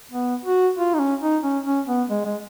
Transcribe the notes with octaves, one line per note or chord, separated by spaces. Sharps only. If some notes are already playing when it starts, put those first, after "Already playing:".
B3
F#4
F4
D#4
C#4
D#4
C#4
C#4
B3
G#3
G#3